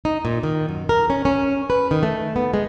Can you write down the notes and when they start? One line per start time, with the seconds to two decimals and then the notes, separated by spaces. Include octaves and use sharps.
0.05 D#4
0.25 A#2
0.43 D#3
0.69 F#2
0.89 A#4
1.10 C#4
1.25 C#4
1.70 B4
1.91 D#3
2.03 A3
2.36 B3
2.54 G#3